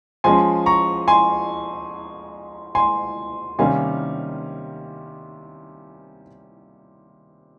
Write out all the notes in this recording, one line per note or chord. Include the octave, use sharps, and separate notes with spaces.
F3 G#3 C#4 G#5 C6
A#5 C#6
G#5 C6
G#5 C6
C3 D#3 G3 A#3 C#4 F5 G#5